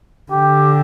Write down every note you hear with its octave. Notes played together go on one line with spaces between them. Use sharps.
D3 G4